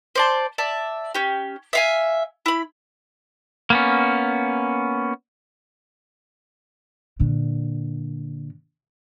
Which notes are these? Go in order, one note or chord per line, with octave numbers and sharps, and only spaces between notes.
C5 D5 A5
D5 E5 A5
C#4 G4
E5 F5 G#5
E4 B5
A#3 B3 C#4
A#2 D3